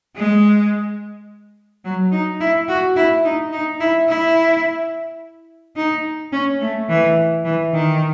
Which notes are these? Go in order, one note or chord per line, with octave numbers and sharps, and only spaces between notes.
G#3
F#3
D#4
E4
F#4
E4
D#4
D#4
E4
E4
D#4
C#4
A3
E3
E3
D#3